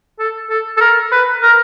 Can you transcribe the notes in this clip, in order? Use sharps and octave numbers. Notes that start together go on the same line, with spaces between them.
A4
A4
A4
A#4
B4
A#4